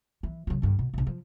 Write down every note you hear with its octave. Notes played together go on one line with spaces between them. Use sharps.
E3
C#3 F#3
G2 D3
B2
A#1 C3
F3